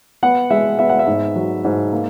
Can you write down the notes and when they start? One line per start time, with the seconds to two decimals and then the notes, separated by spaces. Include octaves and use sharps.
0.23 B3 F#5
0.50 G#3 E5
0.79 B3 E5
0.89 F#5
0.99 E5
1.07 G#2
1.36 F#3
1.64 G#2
1.93 A#3